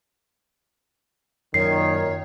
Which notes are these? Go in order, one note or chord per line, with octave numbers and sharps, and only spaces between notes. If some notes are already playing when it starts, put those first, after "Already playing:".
F#2 A#2 D#3 C#5 C7